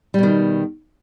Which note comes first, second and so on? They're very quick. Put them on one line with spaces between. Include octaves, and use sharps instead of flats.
G3 B2 D#3